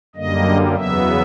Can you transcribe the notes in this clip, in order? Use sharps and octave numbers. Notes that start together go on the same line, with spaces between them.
F#2 D3 G3 A#3 D#5
E2 C#3 F#3 B3 E5